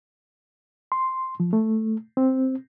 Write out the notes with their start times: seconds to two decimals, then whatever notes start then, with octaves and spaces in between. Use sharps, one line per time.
0.92 C6
1.40 F3
1.53 A3
2.17 C4